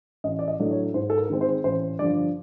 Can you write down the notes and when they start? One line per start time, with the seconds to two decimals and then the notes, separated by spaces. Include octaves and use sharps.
0.24 A1 D#5
0.39 D5
0.48 D#5
0.60 A2 F#3 A3 D4
0.71 C#5
0.94 G#2 C5
1.10 A4
1.18 A#4
1.30 D#3 G#3 C4
1.41 C5
1.64 A1 C5
1.99 G2 D3 F3 D5